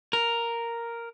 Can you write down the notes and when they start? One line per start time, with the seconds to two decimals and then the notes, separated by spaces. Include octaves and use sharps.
0.13 A#4